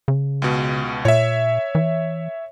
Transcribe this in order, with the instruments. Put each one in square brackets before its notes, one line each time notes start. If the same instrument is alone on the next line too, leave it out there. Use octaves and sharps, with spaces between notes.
[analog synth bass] C#3
[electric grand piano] C#2 B2
[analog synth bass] A#2 [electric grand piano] C#5 E5
[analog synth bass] E3